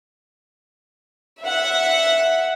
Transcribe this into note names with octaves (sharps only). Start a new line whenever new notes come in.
E5 F#5